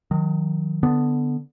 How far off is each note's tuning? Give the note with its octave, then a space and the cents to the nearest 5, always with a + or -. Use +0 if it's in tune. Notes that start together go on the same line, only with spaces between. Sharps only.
D#3 +0 F#3 -40
D3 +0 B3 +0